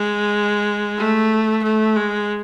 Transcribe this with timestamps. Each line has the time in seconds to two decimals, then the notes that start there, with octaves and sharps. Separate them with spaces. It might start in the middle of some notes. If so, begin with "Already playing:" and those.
Already playing: G#3
0.97 A3
1.63 A3
1.96 G#3